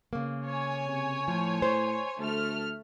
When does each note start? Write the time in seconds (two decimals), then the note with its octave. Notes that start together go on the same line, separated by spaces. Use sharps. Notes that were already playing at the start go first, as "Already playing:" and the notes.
0.13 C#3 A#3
0.47 C#5 G#5
0.86 C3
1.28 A2 F3
1.62 C5
2.19 D2 A3 F6